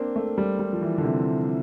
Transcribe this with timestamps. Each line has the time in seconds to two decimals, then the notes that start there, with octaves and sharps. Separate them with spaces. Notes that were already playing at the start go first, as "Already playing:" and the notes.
Already playing: A#3 C4 D4
0.16 A3
0.38 G3
0.59 G3
0.73 F3
0.81 E3
0.98 D3
1.03 C3